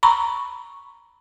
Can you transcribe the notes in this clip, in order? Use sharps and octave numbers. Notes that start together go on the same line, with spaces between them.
A#5 B5 C#6